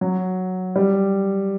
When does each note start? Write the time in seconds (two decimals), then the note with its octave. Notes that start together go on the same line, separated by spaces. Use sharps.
0.01 F#3
0.76 G3